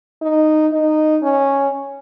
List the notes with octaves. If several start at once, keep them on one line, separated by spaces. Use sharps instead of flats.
D#4
D#4
C#4